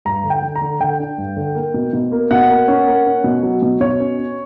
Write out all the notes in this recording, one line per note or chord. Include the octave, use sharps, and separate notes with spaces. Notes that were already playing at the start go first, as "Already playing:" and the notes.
G2 A#5
D3
G5
D3
A#5
D3
D3 G5
D4
G2
D3
A#3
B2
B2
A#3
B2 F#5
A#3
C#4
A#3
C#4
B2
F#3
B2
B2 C#5
C#4
C#4